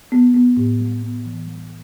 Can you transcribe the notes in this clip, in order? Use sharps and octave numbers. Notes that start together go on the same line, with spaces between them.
B3
B3
A2
G3
B3
E3
G3